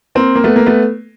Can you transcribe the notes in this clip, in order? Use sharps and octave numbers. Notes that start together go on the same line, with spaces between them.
A#3 C4
A#3
A3 B3
A#3
A3 B3